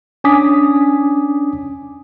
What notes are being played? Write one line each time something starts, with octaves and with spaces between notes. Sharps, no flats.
C#4 D4 G#5 D6 D#6 B6